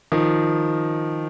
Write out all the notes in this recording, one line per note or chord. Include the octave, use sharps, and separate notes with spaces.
D#3 F3